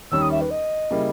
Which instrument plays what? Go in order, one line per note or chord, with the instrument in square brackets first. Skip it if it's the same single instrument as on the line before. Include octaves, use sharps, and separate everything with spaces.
[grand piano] D#2 D#3 G3 C#4 [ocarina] E6
[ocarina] D#6
E5
B4
D#5
[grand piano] C#3 G3 A#3 E4